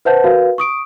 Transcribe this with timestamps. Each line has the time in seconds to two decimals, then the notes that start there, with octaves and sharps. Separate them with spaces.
0.05 B4 C5 E5 F#5 A5 G6
0.24 F#4 A#4 B4 F5
0.58 C#6 D#6 D7